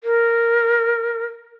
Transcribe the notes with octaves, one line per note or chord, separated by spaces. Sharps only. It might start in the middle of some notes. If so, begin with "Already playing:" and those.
A#4